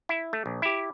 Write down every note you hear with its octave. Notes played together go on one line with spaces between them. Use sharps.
E4
A3
A#1
E4 G4